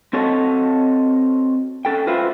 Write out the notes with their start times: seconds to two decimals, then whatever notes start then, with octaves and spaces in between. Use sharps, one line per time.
0.13 C4 F#4 A4 C#5 D#5 A5
1.85 C#4 A4 G5
2.07 F4 F#4 B4 C5 E5